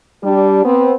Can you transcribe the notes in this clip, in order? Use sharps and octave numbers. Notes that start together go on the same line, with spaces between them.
G3 D4 G4
B3 C4